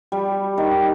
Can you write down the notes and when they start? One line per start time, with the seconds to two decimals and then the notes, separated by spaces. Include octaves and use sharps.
0.12 G3
0.57 D#3